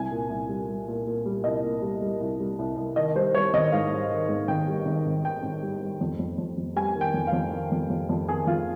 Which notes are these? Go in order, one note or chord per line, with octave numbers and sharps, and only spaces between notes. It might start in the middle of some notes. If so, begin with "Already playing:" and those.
Already playing: C2 G#5
A#2
C2
G3
G3
A#2
A#2
G3
C2 D#5
A#2
G3
G3
C2
G3
C2
C2
D#3 D#5
G3 C5
G3 C#5
G#1 D#5
G#2 F5
G3
D#3
G#2
G#1 G5
G3
G#1
G#1
D#3 G5
G#1
G3
G3
F2
F2
F2
F2
G3 G#5
D#3
G5
F2
F5
F2
D#3
F2
F2
F2
D#3 G#4
F2 F4